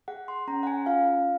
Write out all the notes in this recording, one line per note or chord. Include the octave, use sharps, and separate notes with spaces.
G#4 F#5
C6
C#4 A#5
F#5
G#5
F4 F5